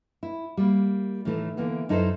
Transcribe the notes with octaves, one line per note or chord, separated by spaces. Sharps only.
E4
G3 A#3
A2 D#3 E3 A3
D3 E3 A#3 B3
F#2 D#4 E4 A4 A#4 C5